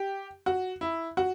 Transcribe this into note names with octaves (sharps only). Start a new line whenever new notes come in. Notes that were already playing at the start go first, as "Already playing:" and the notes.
Already playing: G4
F#4
E4
F#4